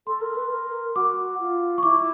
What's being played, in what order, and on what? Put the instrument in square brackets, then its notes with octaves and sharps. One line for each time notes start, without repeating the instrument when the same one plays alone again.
[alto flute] A4 [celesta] C6
[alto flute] A#4
B4
A#4
[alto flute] F#4 [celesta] D6
[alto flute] F4
[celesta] C#6
[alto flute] E4 [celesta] D6